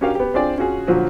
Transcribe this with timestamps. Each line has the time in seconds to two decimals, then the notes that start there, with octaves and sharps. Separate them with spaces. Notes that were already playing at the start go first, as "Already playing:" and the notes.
0.01 C#4 D4 F#4 G4 A#4 F5
0.15 B3 G4
0.34 C4 D4 F4 G#4 D5 G5
0.58 C#4 F4 F#4 G#4
0.87 A#2 D3 F3 F#3 F#4